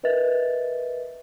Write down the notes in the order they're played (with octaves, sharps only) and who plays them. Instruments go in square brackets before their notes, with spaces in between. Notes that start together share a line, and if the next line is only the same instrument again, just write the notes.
[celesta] A#4 B4 D#5 E5 A6